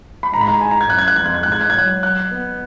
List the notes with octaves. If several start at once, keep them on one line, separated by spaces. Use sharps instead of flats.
B5
G#2 A#5
B5
A#5
G#5
A#5
G#6
F#2 F#6
G#6
F#6
F2 G#6
F#6
G#6
G#2 F#6
G#6
F#6
G#6
F#3 F#6
F#6
B3